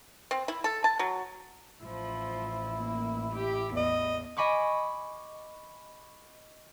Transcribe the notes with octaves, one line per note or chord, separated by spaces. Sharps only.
C4
E4
A4
A5
F#3
A1 F3 E4
A#3
G4
E2 D#5
D#5 G#5 B5 C#6 D6